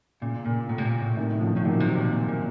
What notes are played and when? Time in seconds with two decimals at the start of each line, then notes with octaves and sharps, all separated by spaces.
0.21 A#2 C#3
0.45 A#2
0.69 A2
0.78 C3
0.85 A#2
1.01 A2
1.17 C3 D#3
1.41 C#3 F3
1.57 A2
1.64 A#2 D#3 F#3
1.80 C3
1.97 A#2
2.13 A#2
2.28 A#2